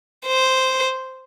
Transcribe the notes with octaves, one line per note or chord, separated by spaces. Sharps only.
C5